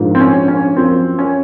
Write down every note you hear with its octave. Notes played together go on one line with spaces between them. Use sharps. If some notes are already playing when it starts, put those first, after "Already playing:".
Already playing: A#1 G#2 F3 A#3
C4
C#4
C#4
F#2 F3 A#3 C4
C#4